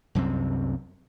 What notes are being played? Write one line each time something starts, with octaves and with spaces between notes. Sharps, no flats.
C2 F#2 C3 C4